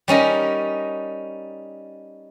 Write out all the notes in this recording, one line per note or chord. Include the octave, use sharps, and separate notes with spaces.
G3 C#4 D#4 A#4